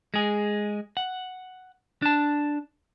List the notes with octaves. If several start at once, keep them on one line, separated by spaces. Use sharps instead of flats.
G#3 G#4
F#5
D4 A5